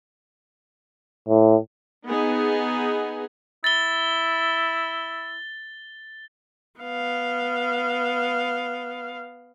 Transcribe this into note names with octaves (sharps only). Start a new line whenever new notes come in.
A2
B3 D#4 G#4
E4 A6 G7
B3 F5